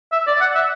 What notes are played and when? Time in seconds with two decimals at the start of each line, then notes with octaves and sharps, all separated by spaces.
0.12 E5
0.27 D5
0.41 F#5
0.55 E5